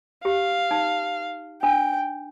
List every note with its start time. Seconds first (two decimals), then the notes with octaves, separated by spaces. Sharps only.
0.25 G4 F5
0.71 D#4
1.63 D4 G5